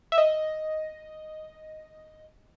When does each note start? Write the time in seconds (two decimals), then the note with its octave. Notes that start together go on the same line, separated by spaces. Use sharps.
0.12 E5
0.18 D#5